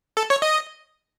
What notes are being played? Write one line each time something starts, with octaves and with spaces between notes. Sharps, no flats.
A4
C#5
D#5